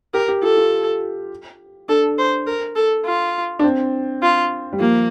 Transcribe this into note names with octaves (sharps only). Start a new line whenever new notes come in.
G4 A#4
G4
F4 A4
F4
D4 A4
C5
A#4
A4
F4
D4
C4
F4
G3
F3 A#3